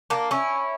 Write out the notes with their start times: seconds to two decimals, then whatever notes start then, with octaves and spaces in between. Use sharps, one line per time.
0.10 A#3 D4
0.31 C#4 E4